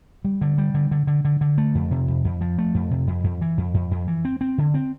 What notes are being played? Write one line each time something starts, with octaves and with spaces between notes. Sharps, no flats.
G3
D3
G3
D3
D3
D3
D3
D3
A3
F2
C3
F2
F2
F3
A3
F2
C3
F2
F2
E3
F2
F2
F2
E3
C4
C4
D3
C4